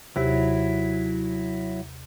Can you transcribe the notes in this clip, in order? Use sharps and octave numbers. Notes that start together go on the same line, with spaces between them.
D#2 C3 F#3 E4 G4